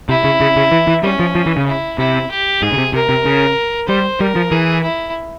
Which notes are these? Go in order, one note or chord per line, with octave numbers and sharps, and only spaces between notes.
C3 E4
C#3
C#3
C#3
E3
E3
G3 C#4
F3
F3
E3
C#3
E4
C3 E4
G4
G#2 G#4
C#3
C3
C3 A#4
C3
C#3
G3 C5
G3 A#4
F3
E3 G#4
E4